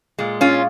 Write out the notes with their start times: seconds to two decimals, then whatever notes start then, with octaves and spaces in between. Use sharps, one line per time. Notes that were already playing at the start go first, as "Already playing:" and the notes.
0.18 A#2 G#3
0.41 C#4 F4